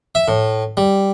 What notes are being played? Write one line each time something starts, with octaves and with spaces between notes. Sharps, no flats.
E5
A2
G3